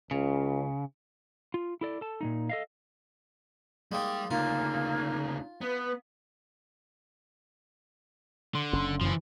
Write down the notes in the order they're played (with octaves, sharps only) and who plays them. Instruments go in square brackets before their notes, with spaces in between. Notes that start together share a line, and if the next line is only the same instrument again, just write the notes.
[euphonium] C#2 [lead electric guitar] C#3
[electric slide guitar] F4
E4 A4 D5
A4 A5
A#2 G#3 D#4
A4 D#5 F5
[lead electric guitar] G3 G5 [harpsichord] G#3 A#3 D#4
[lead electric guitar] D2 C#3 [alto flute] A#3 [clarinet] D#4 [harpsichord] F4
[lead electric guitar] B3 [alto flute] B4
[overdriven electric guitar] D3 [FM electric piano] C6
[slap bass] F#1 C#4
[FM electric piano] F#2 C#3 [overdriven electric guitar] E3 F3